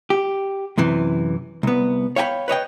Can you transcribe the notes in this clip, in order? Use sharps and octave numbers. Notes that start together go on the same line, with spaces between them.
G4
F#2 C3 E3
C2 B3
C#5 F5 G5 G#5 B5
B4 C#5 D#5 G5